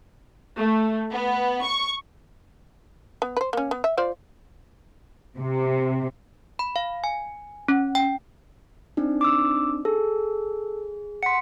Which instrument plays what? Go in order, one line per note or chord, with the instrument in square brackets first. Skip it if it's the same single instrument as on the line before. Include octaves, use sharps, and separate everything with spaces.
[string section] A3
B3
C#6
[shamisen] B3
B4 C5
A#3 C#4
B3
E5
F4 C5 D5
[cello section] C3
[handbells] B5
F5
G#5
C#4
G5
[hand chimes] C4 D4 D#4
[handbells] D6 E6
[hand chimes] G#4 [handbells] A4
[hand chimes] F#5 C6 [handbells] B6 C#7